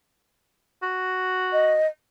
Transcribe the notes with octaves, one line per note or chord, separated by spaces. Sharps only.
F#4
D#5